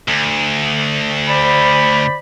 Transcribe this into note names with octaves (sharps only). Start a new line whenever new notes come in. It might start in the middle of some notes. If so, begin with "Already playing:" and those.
D2
C5 D5 B5